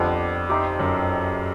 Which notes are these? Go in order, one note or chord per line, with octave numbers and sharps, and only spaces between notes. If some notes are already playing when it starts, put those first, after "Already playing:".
Already playing: F2 B3 D4 G4 C5
D#4 G4 C5 E5
F#2